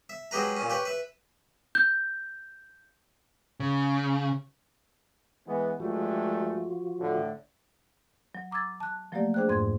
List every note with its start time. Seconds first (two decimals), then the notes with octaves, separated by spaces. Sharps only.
0.09 E5
0.31 F#3 G#3 G4 B4 A#5
0.56 A#2 C#4
0.70 G4 B4 C#5
0.85 B4 E5
1.75 G6
3.60 C#3
5.47 E3 G#3 B3
5.80 G2 F3 G#3 A3 F4 F#4
7.00 A2 D3
8.35 F#3
8.51 A#5 D6 E6 G#6 A6
8.80 A5 F#6
9.12 F3 F#3 A3 A#3 G4 D5
9.34 D4 G#4 C5 G5 F#6
9.48 F2 G#2 C6 G#6